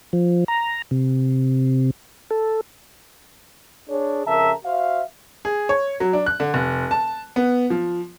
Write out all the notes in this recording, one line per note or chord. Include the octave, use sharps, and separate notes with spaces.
F3
A#5
C3
A4
D4 G#4 C#5
F2 C#3 A#4 E5 A5 A#5
F#4 C5 E5 F5
G#4
C#5
F#3
D4
F#6
D3
F1
A5
B3
F3